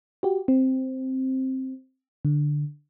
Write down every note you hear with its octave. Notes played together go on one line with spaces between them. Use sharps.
F#4 G4
C4
D3